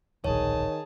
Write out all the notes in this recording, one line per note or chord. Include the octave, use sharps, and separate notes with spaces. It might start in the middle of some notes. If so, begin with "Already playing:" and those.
D1 A#1 D#3 G#4 C#5 A5